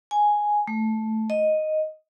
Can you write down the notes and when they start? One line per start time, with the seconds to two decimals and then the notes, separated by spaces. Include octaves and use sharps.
0.11 G#5
0.67 A3
1.30 D#5